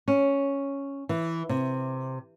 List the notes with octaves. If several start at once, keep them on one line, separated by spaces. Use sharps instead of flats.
C#4
E3
C3